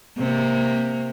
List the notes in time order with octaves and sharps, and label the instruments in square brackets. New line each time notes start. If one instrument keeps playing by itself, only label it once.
[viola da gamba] C3 A#3